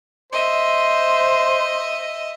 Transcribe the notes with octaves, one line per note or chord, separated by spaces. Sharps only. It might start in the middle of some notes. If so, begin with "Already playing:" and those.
C5 D#5 E5